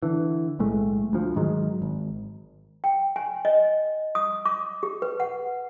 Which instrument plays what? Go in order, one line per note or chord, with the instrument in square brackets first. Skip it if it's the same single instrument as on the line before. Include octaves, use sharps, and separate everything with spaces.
[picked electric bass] D3 E3
B1 A2 G#3 A3
D2 F3
G#2 D#3 F#3 G#3
G#1
[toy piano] G5
G#5
D#5
D#6
D6
G4
B4
F#5